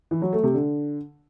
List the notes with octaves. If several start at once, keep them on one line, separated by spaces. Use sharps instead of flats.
E3
F#3
A3
C3
D3